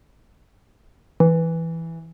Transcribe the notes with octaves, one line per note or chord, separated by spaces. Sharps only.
E3